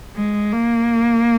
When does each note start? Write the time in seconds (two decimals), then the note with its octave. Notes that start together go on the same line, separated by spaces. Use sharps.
0.16 G#3
0.53 A#3